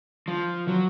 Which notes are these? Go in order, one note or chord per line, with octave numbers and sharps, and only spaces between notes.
F3
F#3